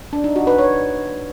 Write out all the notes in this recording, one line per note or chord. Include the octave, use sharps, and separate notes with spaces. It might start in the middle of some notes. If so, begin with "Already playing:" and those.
D4
D#4
F#4
B4
C#5